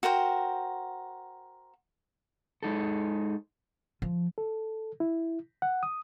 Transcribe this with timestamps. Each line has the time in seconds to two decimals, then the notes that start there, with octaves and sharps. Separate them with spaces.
0.03 F#4 A#4 C5 G5
2.63 G#3 D#4 A4
4.02 F3
4.38 A4
5.00 E4
5.62 F#5
5.83 D#6